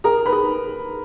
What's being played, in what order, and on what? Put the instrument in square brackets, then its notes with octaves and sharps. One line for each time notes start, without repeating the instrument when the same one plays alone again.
[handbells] G#4 [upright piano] A#4 A#5
[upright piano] B4 B5
[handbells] G#4